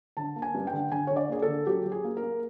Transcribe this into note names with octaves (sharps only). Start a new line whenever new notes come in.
D3 A5
A#3
G#5
G2
G5
D3
D3 G#5
D3 C#5
D5
A#3 G#4
A4
D3
F#3 G4
F#3
G#4
A#3
A#4
A#3